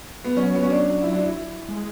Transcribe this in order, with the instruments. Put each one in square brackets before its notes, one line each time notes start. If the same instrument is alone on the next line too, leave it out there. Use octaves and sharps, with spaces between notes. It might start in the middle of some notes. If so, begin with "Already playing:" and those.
[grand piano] B3
[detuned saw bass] F#3 [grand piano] C#4
[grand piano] B3
C#4
D4
E4
D4
E4
[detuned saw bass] G#3